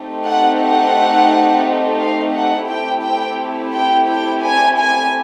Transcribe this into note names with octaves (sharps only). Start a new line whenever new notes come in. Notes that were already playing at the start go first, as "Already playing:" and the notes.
Already playing: A3 C4 D#4 G4
F#5
F#5
F5
F#5
A3 C4 E4 G4 G5
G5
G5
G5
G#5
G#5